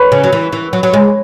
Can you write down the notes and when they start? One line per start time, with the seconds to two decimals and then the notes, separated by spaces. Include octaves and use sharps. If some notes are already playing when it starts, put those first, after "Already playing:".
Already playing: B4 C#5
0.12 C#3
0.24 F#3
0.33 E3
0.52 E3
0.73 F#3
0.83 F#3
0.93 G#3